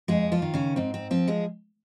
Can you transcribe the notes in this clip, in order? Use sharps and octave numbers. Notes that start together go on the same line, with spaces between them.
F2 G#3 G#4
F3 F4
D#3
C#3 C#4
G#2 C4
C4
F3 C4
G#3 G#4